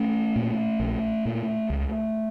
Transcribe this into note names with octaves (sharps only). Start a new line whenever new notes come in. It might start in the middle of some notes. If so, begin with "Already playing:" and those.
Already playing: A3 C#4
A#2
A#1
A#2
C#2